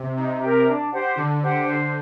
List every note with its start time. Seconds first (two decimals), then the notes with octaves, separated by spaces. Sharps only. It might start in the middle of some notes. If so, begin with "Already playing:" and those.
Already playing: C3
0.17 C3 D#4
0.41 G4 A#4
0.67 D4
0.92 G4 C5 F#5
1.17 D3 D4
1.43 G4 C5 F#5
1.67 D3 C5